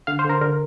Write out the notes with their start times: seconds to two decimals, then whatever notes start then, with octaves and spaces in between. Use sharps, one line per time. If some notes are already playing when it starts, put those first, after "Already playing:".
0.07 D3 F5
0.19 C5
0.25 D3 A#4
0.41 D3 A#4